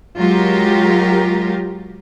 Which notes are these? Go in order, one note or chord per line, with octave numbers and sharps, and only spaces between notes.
F#3 G#3 F4 G4 A#4